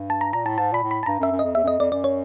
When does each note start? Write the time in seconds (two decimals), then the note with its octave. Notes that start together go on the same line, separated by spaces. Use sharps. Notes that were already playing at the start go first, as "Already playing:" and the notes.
Already playing: G2
0.10 A5
0.21 A#5
0.33 A#2 A#5
0.46 A2 A5
0.58 G#2 A5
0.72 A#2 B5
0.83 A2
0.91 B5
1.03 A5
1.06 G2 A#5
1.20 F#2
1.23 E5
1.31 F#2
1.39 F2 D#5
1.55 E2 E5
1.64 F#2
1.68 F2 D#5
1.79 F2 D5
1.92 F#2 D5
2.04 C#5